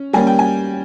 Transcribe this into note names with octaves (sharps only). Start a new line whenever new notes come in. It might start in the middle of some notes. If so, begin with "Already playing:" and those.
Already playing: C#4
G3 A#3 C#4 G#5
G5
G#5